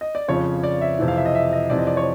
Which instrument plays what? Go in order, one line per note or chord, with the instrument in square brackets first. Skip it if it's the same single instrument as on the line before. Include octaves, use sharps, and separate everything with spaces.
[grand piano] D#5
D5
F2 C#3 F3 C#5
D5
E5
F2 C3 E3
F5
E5
D#5
E5
D#5
F2 C3 E3 D5
D#5
D5
C#5